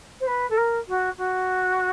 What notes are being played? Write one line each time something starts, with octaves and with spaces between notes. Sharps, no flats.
C5
B4
A4
A#4
F#4
F#4